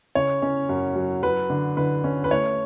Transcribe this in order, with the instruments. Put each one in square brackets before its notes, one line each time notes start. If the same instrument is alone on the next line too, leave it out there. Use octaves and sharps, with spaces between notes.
[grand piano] C#3 C#5
C#4
F#2
F#3
F#3 B4
D3
D3 B4
C#4
B4
A3 C#5